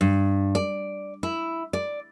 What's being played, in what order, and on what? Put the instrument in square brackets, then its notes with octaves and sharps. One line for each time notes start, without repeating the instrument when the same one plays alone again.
[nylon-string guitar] G2
D5
E4
D5